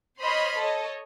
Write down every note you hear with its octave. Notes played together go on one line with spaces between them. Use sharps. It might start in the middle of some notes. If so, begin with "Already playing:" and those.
C5 C#5 D#5 B5 C6 F6
A4 C#5 D#5